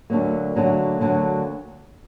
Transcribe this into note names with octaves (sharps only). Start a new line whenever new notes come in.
D2 D3 F#3 A#3
D2 D3 F#3 A#3
D2 D3 F#3 A#3